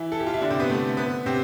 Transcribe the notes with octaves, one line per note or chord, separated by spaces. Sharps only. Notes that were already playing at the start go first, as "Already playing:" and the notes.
Already playing: E3 E4
A4
G4
F4
E4
D3 D4
C3 C4
B3
A3
B3
C3 C4